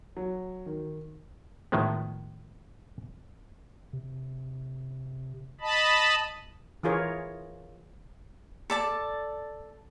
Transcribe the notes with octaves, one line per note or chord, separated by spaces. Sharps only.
F#3
D#3
A2 D#3 F3 G#3 B3
C3
D#5 A5 B5
E3 F4 G#4 A#4 C#5
A4 D5 A5